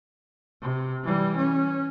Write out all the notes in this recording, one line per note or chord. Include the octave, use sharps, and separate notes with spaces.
C3
E3 G3
C#4